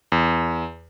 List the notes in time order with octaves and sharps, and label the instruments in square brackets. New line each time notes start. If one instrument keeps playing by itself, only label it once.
[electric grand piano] E2